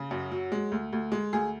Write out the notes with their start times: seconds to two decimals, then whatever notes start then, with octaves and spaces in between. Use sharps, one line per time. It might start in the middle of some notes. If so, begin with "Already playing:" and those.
Already playing: C#3
0.11 F#2
0.32 F#3
0.52 G#3
0.72 D2
0.93 D2
1.12 G#3
1.33 D2 G#4